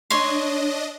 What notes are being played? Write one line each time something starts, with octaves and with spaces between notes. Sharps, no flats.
D4 C#5 D#5 C6